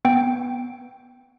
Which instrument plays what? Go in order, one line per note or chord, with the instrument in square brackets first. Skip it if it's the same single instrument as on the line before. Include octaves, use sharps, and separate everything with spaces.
[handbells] B3 G5